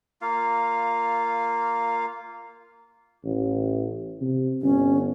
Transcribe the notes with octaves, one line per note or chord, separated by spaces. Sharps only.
A#3 F4 F5
A1
C3
G1 C#4